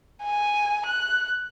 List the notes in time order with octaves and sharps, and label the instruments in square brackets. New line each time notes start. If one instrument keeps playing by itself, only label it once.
[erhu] G#5
F#6